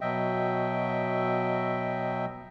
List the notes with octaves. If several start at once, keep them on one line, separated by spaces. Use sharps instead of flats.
B2 F#3 D#5 E5 G5